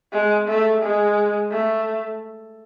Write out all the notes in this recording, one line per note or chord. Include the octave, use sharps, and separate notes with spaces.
G#3
A3
G#3
A3